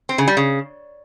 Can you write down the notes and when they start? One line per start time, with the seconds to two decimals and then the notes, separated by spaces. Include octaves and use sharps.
0.09 C4
0.18 C#3
0.28 G3
0.37 C#3